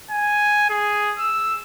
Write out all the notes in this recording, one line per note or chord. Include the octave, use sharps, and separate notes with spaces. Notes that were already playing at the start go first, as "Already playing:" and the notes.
G#5
G#4
E6